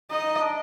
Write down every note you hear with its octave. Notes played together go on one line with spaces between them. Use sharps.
D#4 D#5
D4